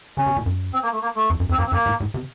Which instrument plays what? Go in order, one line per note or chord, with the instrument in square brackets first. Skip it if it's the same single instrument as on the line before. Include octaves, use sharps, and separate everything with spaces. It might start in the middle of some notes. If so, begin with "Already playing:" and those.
[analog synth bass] C#3 [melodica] C#4
[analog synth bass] C3
A#2
F#2
[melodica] C4
A#3
A3
A#3
A3
[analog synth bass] F2
F#2
[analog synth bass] F2 [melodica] C4
[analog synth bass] F#2 [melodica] A#3
[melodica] C4
[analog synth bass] F#2 [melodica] A#3
[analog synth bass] A2
A2
C3